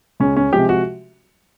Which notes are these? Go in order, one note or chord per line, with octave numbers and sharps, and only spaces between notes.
C#2 C#4
C#4
C3 F3 G#3 G4
F#4